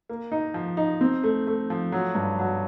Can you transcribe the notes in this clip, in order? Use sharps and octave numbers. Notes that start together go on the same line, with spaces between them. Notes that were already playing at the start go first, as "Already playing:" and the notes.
A#3
D#4
F3
D#4
C4
A3
A3
F3
F#3
G2
F#3